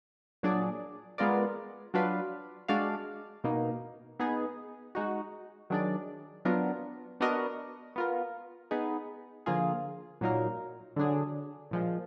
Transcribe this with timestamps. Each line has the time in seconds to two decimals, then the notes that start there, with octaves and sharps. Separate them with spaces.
0.43 A#2 F#3 D4 G#4 D5
1.18 G#3 B3 F4 A#4 D5
1.94 F#3 D4 F4 B4 F5
2.68 G#3 D4 F#4 D5 F5
3.44 B2 A#3 D#4
4.20 B3 D#4 G#4
4.95 G#3 D#4 F#4
5.70 D#3 F#3 D4 G#4 D5
6.45 F#3 B3 D4 F4 A#4
7.20 B3 D4 F#4 A#4 D#5
7.96 B3 F4 A#4
8.71 B3 D#4 G#4
9.46 D3 F3 A#3 F4 G#4
10.21 A#2 F#3 A#3 D#4 A#4
10.96 D3 F#3 D4 G#4
11.71 A#2 F3 G#3